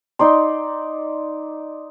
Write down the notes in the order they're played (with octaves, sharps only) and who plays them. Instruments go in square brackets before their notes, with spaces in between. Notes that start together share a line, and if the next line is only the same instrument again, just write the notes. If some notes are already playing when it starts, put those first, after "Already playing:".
[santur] D#4 D5 C6